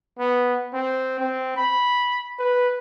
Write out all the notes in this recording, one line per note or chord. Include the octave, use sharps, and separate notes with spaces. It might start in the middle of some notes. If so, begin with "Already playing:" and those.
B3
C4
C4
B5
B4